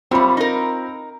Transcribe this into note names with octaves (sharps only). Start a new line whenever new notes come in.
F#2 G3 C4 F4 B5
D#4 A#4